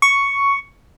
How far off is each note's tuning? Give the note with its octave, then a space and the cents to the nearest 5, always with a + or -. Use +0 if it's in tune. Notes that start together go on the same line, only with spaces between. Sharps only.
C#6 +5